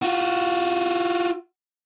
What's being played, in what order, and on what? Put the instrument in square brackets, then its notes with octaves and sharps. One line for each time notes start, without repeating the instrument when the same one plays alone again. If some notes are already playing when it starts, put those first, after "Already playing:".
[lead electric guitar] F4 F#4